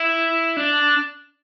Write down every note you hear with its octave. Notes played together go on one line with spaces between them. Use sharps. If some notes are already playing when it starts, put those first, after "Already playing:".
Already playing: E4
D4